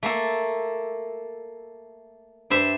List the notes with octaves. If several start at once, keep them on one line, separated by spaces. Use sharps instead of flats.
A3 A#3 A4
G2 C5 E5